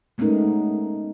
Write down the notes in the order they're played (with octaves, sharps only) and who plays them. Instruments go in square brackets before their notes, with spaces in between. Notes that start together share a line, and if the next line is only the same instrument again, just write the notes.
[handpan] G#3 A3 B3 C#4 D#4 A#4